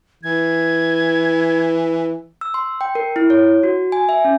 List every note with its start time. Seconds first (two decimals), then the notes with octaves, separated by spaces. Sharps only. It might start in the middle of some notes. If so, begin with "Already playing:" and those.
0.23 E3 G#6
2.41 E6
2.54 C6
2.81 G5
2.95 A#4
3.16 E4
3.30 C#5
3.63 F#4
3.92 G#5
4.09 E5
4.25 C#4